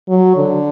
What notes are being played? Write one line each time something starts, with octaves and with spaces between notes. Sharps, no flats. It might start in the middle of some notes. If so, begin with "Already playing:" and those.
F#3
D3